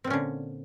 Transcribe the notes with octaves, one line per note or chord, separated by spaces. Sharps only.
A#2 D3 C4 C#4